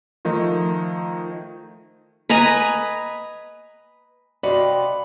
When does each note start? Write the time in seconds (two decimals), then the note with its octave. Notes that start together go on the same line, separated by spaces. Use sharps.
0.25 D#3 F3 A3 D#4
2.29 B4 D#5 G#5 A#5
4.43 C3 D#4 F4 F#4 D5 G5 B5